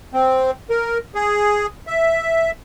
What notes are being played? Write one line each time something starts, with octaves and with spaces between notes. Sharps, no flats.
C4
A#4
G#4
E5